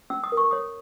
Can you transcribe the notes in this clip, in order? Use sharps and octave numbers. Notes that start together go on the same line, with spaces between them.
C#4 E6
D#6
A#4
C#6
C#5 D#6